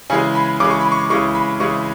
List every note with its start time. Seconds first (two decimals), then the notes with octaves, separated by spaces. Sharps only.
0.10 C#3 E3 G#3 G#5
0.35 B5
0.60 C#3 E3 G#3 D6
0.70 C#6
0.81 B5
0.92 C#6
1.10 C#3 E3 G#3 C#6
1.35 B5
1.60 C#3 E3 G#3 C#6